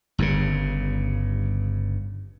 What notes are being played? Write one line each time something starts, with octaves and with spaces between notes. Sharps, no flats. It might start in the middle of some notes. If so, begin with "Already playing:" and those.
G1 G2 A#2 C#3